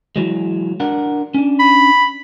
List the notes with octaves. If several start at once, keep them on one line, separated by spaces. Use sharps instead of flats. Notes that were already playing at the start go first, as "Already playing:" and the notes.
E3 F#3 G#3
D4 A#4 F#5
C#4 D4
B5